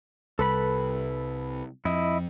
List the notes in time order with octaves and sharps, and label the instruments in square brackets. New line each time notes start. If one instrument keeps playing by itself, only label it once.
[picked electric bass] C2 [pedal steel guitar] A4 B4 B5
[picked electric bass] F2 [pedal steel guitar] E4 D#5